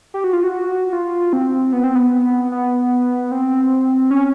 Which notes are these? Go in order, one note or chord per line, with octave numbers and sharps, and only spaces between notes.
G4
F#4
F4
F#4
F4
C4
B3
C4
B3
B3
C4
C#4